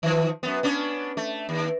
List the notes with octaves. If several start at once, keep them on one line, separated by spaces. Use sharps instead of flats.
D#3 F3
F#2 B3
B3 C#4 D4
A3
D#2